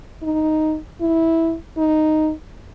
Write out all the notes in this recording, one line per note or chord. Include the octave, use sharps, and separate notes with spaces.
D#4
E4
D#4